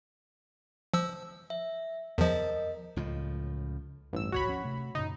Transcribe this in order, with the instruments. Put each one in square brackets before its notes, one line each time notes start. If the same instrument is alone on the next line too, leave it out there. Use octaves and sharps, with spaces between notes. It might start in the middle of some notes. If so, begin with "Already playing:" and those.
[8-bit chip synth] F3 E6
[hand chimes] E5
[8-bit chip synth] E2 F3 [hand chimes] A#4 D#5
[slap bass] C#2 A2 F3
[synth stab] A1 E6 [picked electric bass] G2
[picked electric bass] D1 G#1 C#2 [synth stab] F#4 C#5 B5
[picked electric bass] F3 C#4
C3 A3
[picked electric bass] F#2 A#2 C#3 [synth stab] D#4